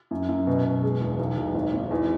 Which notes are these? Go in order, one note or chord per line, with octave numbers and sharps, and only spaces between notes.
F#2
F#2
B2
B2
G#3
E1
B1
B1
G#1
G#1
E2